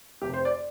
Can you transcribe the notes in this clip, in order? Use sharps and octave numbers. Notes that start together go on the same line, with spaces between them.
F1 F2 C3 G4
C5
D5